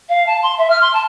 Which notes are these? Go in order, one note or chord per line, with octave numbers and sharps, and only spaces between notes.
F5
A5
C6
E5
F6
C6
A5